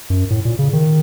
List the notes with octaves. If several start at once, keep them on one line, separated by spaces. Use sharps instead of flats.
F#2
A2
A#2
C#3
D#3